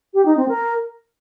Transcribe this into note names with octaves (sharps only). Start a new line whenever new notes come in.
G4
D#4
C4
A#4